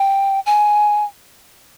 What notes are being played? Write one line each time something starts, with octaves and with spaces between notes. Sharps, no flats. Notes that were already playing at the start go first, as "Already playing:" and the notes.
Already playing: G5
G#5